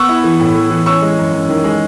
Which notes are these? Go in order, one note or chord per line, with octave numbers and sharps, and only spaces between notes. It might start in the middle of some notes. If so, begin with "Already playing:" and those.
Already playing: B3 C#6 E6
E4
E3
A2
E3
E3
C#4 C#6 E6
G#3
F#2
F#2
D#3
G#3